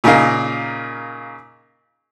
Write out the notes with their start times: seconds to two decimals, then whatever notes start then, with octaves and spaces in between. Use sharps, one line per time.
0.04 A#2 C#3 D#4 A#4 F5